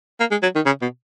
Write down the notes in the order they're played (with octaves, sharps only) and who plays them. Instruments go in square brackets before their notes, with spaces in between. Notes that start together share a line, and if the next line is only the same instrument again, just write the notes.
[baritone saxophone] A#3
G#3
F#3
D#3
C#3
B2